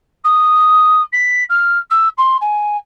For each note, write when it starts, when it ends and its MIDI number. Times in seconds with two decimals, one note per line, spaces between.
0.24 1.02 87
1.12 1.44 95
1.49 1.78 89
1.90 2.08 88
2.18 2.37 84
2.41 2.77 80